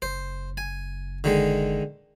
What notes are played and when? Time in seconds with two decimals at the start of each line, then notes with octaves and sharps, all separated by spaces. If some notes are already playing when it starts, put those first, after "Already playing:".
0.02 F#1 C5
0.57 G#5
1.24 D3 D#3 G#3